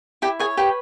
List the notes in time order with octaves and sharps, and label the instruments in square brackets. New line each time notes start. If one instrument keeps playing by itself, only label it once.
[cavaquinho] E4 G4 G5
G#4 C#5 G#5
G4 B4 G5